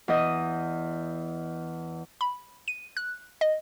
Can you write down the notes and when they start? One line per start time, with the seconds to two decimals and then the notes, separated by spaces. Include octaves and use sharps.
0.08 E2 D#5
2.21 B5
2.68 D#7
2.97 F#6
3.41 D#5